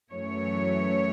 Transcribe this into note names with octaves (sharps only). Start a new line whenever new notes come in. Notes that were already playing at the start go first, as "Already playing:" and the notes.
F#2 E3 A3 C#5